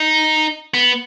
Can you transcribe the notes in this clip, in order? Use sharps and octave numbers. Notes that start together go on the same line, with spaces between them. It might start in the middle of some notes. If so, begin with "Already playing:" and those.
Already playing: D#4
B3